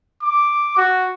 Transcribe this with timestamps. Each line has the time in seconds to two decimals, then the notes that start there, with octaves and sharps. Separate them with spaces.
0.23 D6
0.77 F#4